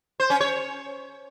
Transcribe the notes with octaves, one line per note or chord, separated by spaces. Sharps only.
C5
C#4
C#5